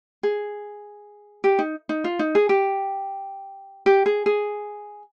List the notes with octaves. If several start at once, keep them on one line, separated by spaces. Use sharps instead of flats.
G#4
G4
D#4
D#4
F4
D#4
G#4
G4
G4
G#4
G#4